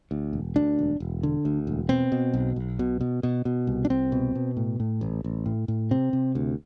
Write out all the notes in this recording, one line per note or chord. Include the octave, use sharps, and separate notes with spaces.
D2
E1
D2 D4
E1
E1
D3
D2
E1
B2 C4
B2
B1
B1
B2
B2
B2
B2
C2
D4
C2 C4
B2
B2
A2
A2
A1
A1
A2
A2
C3 C4
C3
D2